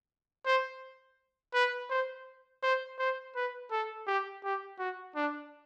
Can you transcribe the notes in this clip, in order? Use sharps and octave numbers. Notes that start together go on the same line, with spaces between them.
C5
B4
C5
C5
C5
B4
A4
G4
G4
F#4
D4